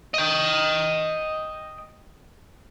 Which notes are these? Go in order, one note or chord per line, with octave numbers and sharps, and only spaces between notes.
D#5 G5